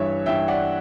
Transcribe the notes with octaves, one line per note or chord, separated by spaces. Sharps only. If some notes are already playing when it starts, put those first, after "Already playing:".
Already playing: G2 E3 C#5 E5
G2 E3 E5 G5
D5 F#5